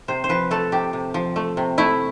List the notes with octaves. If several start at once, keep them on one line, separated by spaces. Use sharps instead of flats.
C3 C5
C5
F3 B4
A3 A4
C3 G4
C3
F3
A3
C3
A3 E4